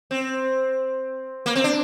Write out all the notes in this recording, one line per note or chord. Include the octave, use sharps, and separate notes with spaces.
C4
A#3
C4
D4